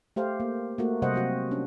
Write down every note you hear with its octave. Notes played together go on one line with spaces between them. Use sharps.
A3 G4 C5 F5
A#3
A3 A#3 F#4
C3 G3 C5 D#5 F#5
F#3 C4 F#4
C#4 D4